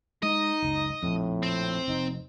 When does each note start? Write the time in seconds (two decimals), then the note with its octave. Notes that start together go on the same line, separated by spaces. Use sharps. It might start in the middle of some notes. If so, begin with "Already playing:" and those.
0.23 G#3 D#4 D#5
0.62 F#1 C#2
1.02 A#1 F2 A2
1.43 C4
1.88 F1 D#4